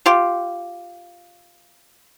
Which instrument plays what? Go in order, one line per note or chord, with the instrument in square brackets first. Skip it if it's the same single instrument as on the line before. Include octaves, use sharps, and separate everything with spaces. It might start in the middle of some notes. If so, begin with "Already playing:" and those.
[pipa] F4 G4